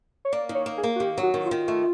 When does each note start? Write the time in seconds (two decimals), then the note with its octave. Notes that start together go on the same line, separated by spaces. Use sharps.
0.25 C#5
0.33 A#3 D5
0.49 D#3
0.55 C#5
0.66 A#3
0.78 G#4
0.83 A#3
0.96 F#4
1.00 D#3 G4
1.18 F#3
1.23 F#4
1.34 D#3
1.46 F4
1.51 D#3
1.68 A3